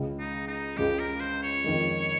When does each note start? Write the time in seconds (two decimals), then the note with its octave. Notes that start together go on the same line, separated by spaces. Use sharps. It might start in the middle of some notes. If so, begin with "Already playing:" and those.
Already playing: C#2 C#3 G#3
0.19 D#4
0.47 D#4
0.76 C#2 C#3 G#3 G4
0.99 A#4
1.20 C5
1.43 C#5
1.64 F2 D#3 G#3